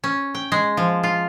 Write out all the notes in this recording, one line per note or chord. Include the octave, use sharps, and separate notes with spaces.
C#4
G5
G#3
F3
F4